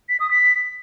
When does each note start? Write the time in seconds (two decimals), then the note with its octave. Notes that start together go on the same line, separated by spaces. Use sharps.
0.09 B6
0.20 D#6
0.31 B6